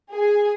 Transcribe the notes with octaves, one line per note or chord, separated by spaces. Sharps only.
G#4